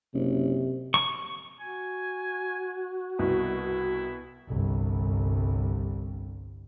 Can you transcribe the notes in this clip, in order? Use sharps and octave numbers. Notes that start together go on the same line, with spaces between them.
F#1 C3
C#6
F#4 G#5
C2 B2 E4
G1 C2